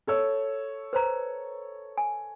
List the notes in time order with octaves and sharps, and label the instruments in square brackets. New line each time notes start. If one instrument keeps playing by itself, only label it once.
[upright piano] A4 C#5 E6
[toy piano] B4 C5 A#5
G#5